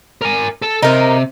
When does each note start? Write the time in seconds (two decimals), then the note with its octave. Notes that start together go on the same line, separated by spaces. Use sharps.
0.22 A#4 G#5
0.62 A4 A5
0.82 C3 D#4 A#4